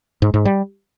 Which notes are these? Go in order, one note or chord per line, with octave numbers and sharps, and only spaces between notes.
G#2
G#2
G3